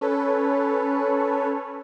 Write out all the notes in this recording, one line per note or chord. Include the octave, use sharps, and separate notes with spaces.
C#4 A4 B4 C#5